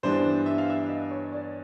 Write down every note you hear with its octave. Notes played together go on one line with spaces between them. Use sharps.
G2 E3 G3 B3 D4 C5
E5
F5
E5
D#5
C#5
D5